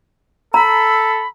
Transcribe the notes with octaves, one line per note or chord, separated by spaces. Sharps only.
A4 A#5 B5 E6